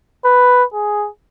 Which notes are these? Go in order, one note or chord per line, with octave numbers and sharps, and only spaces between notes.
B4
G#4